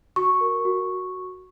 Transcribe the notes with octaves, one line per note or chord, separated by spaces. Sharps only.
F#4 C#6
A#4
F#4